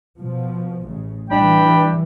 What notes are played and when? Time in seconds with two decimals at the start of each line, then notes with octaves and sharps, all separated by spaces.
0.17 B2 F3
0.85 A1 C#3
1.31 E3 G3 D4 G5 B5